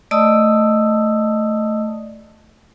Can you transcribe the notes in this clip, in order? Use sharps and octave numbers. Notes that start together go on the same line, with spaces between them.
A3 D5 D#5 A5 D#6 E6